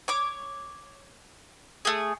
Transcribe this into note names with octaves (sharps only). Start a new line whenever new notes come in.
C#5 D6
A3 G#4